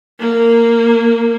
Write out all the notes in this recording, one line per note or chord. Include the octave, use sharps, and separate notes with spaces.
A#3